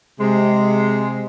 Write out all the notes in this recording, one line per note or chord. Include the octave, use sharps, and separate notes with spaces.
C3 G#3